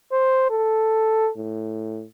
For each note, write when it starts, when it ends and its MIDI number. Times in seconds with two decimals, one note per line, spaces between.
0.12 0.50 72
0.50 1.30 69
1.37 2.05 45